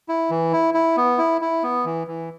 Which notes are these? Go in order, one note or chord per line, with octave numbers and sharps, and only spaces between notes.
E4
E3
E4
E4
B3
E4
E4
B3
E3
E3